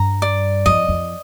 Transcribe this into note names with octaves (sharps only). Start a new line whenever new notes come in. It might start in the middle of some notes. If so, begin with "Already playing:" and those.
Already playing: G2 A#5
D5
F2 D#5
F2